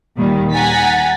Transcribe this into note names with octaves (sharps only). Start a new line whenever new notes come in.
D#2 A#2 D#3 G3
F#5 G#5 A#5 A6 B6